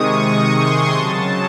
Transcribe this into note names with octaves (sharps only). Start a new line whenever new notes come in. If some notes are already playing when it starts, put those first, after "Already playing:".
Already playing: C3 D#3 G#3 C#6 D#6
C#6
C6
C#3 F#3 A5